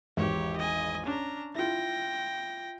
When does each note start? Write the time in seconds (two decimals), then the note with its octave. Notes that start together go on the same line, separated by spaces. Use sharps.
0.17 G#1 E2 G4 C#5
0.57 D#5 G#5
1.06 C#4 D4 A#5
1.55 E4 F4 G5 A#6